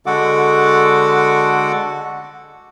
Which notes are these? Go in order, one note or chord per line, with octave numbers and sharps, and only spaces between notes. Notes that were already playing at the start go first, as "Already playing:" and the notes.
D3 G#3 F#4 A4 F#5 D6